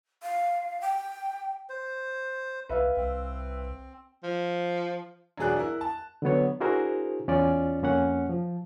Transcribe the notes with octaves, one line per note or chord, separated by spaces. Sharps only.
F5
G5
C5
C2 B4 E5 F5
C2 C4
F3
E1 G2 F#3 G#4 D5 F#6
E4 A#4
A5
D3 F#3 B3 C#5
D4 E4 F#4 G#4 A#4 C5
E2 C#4 F4 D5
F2 A#3 C#4 F#5
F3